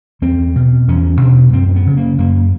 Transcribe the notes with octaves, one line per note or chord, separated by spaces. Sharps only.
E2 C4
B2
E2 C#4
C#4
B2 D4
F#2 C4
C4
B3
C#3
A#3
F#2 A#3